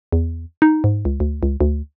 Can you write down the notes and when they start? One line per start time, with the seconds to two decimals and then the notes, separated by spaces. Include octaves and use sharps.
0.12 E2
0.62 D#4
0.84 G#2
1.05 C#2
1.20 D2
1.43 C#2
1.61 D2